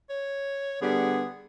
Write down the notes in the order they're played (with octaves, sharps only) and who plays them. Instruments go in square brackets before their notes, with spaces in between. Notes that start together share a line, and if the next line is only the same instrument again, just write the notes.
[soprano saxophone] C#5
[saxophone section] D3 G3 B3 [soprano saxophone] G#4